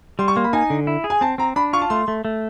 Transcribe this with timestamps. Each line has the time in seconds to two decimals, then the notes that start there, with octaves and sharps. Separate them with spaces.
0.19 G3 C6
0.28 C#6
0.36 A#3 C6
0.44 B5
0.53 D#4 G#5
0.70 D3
0.87 E4
1.04 G#4
1.10 G#5
1.21 C4 A5
1.38 C4 A#5
1.56 D4 B5
1.73 F4 C#6
1.82 A5
1.90 A3 C6
2.08 A3
2.25 A3